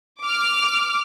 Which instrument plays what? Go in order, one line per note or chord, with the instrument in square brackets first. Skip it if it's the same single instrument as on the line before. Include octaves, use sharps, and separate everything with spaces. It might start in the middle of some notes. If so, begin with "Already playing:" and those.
[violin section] D6 F6